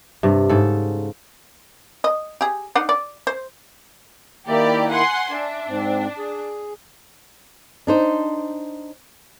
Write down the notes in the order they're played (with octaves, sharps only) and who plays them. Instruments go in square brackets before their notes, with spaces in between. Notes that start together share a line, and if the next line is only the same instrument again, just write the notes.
[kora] G2 C3
G#2 C#3 A4
[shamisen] D#5
G4 G#4
D4 D#4 F#5
D5
C5
[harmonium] D#3 A#3 E4 [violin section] G4 D5
[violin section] F#5 G#5 C6
[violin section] D4 [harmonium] E5
[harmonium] G#2 C4
G#4
[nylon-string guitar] D4 D#4 C5